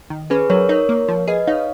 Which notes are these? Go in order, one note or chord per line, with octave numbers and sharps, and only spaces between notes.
D#3
C#4 G#4 B4
F#3 A#4 C#5
D#4 A#4 C#5
A#3
F3
G#4 B4 D#5
D#4 C#5 F5